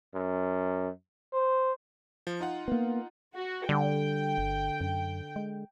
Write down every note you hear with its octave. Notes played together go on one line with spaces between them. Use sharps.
F#2
C5
F3
D#4 F4 F#5
A#3 B3
F#4
D3 G3 G5
G1
F#2
G#3